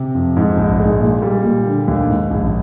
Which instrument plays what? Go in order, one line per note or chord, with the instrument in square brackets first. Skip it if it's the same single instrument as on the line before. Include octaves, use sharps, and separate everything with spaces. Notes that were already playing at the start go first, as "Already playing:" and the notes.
Already playing: [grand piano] C3
F2
G#2
A#1
G#3
A#2
G3
A#2
D3
D#2
G#2
A#1